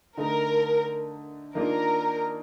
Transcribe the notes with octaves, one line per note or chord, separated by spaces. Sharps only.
D3 A3 D#4 A#4
D#3 A#3 D4 F4 A#4